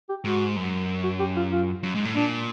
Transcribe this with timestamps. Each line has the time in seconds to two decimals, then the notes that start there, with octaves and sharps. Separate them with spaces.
0.09 G4
0.24 G#2 F#4
0.56 F#2
1.04 F#4
1.20 G4
1.37 F4
1.52 F4
1.83 F#2
1.95 G#2
2.05 A2
2.16 A#2 D4